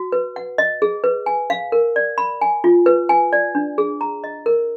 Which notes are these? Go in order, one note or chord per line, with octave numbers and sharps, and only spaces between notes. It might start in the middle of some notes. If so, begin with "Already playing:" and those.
Already playing: F#4
B4
F#5
D#5
G#4
B4
G#5
F5
A#4
D5
B5
G#5
F4
B4
G#5
D5
D4
G#4
A#5
D#5
A#4